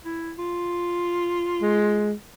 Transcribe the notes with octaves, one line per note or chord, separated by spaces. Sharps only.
E4
F4
G#3